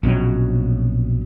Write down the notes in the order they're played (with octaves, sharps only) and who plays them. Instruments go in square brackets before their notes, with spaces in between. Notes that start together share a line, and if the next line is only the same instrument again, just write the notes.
[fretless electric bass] A#1 B2 F#3 C#4